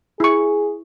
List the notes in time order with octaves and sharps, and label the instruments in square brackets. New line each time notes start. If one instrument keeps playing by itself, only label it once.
[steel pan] E4 C#6 [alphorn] G#4